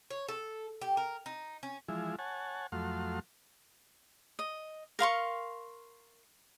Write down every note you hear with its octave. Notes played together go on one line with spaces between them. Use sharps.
C#5
A4
G4
A#4
D#4
C#4
E3 F3 G#3 E4
C#5 F#5 G#5 A5
F2 F#3 A3 F5 C6
D#5
A#4 F5 C6 C#6